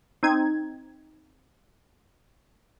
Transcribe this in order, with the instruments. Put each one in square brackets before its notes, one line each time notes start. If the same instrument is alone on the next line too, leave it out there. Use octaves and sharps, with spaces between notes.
[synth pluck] C4 D#4 G#6